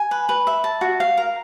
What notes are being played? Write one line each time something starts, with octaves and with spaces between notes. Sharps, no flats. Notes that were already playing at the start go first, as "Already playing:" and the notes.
Already playing: G#5
B4
B4
E5
A5
F#4
F5
A#4